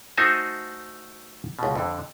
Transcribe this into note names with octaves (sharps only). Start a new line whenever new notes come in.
A3 D#4 F#4 C5 G#5 A5
C#2 B2
F2 D3